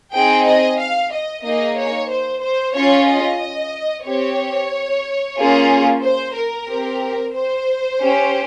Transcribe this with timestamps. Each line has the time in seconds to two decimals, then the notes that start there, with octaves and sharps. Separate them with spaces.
0.13 C4 D#4 G#4 G5
0.45 D#5
0.78 F5
1.11 D#5
1.44 A#3 D#4 G#4 D#5
1.78 C#5
2.10 C5
2.42 C5
2.75 C#4 F4 G#4 C#5
3.07 D#5
4.06 C4 G4 C#5
5.38 A#3 C#4 F4 G#4
6.02 C5
6.35 A#4
6.68 C4 G4
7.34 C5
8.00 C#4 G4